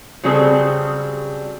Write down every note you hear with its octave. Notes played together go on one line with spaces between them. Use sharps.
C#3 F#3 G3 C4 G#4 A4